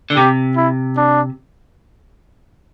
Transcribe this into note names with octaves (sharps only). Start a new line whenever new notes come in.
D3
C3 G4
E4
D4